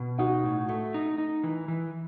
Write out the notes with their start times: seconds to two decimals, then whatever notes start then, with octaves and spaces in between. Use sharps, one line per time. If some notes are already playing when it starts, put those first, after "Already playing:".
Already playing: B2
0.19 D#4 F#4
0.44 A2
0.69 A3
0.94 D#4
1.18 D#4
1.44 E3
1.68 E3